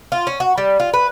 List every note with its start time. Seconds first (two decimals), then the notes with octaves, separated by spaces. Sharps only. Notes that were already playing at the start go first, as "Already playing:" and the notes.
0.12 F4
0.27 C#4
0.40 F#4
0.58 G3
0.80 F4
0.94 B4